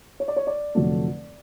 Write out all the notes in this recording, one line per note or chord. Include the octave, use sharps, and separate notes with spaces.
C#5
D5
C#5
D5
F1 F2 D3 F#3 A3